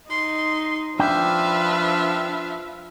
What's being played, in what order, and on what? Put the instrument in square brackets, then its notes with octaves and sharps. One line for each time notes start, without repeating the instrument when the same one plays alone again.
[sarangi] D#4 [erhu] C6
[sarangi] F3 [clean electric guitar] D4 G5 [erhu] B4 [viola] E5 F5